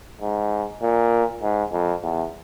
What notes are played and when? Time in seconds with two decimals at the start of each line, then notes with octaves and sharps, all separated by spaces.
0.21 G#2
0.82 A#2
1.42 G#2
1.72 F2
2.03 E2